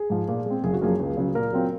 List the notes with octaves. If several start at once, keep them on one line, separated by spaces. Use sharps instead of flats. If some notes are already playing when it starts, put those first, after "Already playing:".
Already playing: G#4
G#2 F3
A#2
G#3 C4
F#1 G#4
F#4
F#2 F3 A#3 G#4
C#2
C#3 F#3
A#2 A#4
F#3 C4 F4